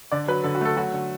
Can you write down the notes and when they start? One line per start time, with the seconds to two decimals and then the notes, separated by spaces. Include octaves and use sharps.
0.12 D3 D5
0.28 F#3 B4
0.44 D3 A4
0.55 F#4
0.61 A3 A4
0.77 F#3 F#4
0.93 D3